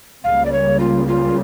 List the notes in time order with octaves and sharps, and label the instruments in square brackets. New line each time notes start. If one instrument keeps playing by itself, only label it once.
[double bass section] C#2 C#3 G3 A#3 [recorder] F5
[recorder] D5
C#5
F4
F4